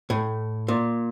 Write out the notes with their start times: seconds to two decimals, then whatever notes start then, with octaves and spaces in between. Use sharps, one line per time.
0.10 A2
0.68 A#2